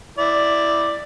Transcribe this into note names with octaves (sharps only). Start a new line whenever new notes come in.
E4 D5